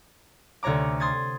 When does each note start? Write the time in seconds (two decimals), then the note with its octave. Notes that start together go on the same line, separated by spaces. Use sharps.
0.63 D2 C3 C#5 A#5 D6
1.00 C6 D#6 G#6 A6